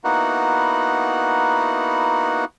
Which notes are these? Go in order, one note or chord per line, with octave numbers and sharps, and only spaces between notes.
A#3 B3 D#4 E4 F#4 F#5